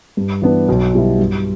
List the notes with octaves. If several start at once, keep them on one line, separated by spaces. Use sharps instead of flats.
G2
E3 B3 D4
B1
B2 G3 B3 E4
G2